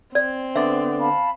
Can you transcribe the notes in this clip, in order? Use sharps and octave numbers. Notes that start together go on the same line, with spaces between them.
C4 D5
D3 B3 D5 E5
F5 A5 B5